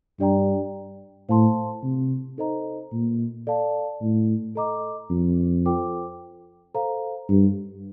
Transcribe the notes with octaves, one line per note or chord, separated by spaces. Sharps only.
G2 D4 G4 D5 G5 A#5
A2 C5 F5 A5 C6
C3
D#4 A4 C5 D#5 A#5
A#2
A4 D5 F5 A5
A2
A4 D#5 A#5 D6
F2
F4 A4 C5 G5 D6
A4 C5 F5 A#5
G2